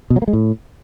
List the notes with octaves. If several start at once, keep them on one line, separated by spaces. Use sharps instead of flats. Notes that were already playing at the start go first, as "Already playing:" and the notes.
B2
F#3
A#3
G#3
A2